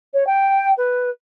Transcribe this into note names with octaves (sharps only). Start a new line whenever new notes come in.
C#5
G5
B4